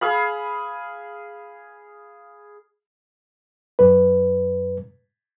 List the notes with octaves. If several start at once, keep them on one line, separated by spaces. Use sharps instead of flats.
G#4 F5 B5
F#2 B4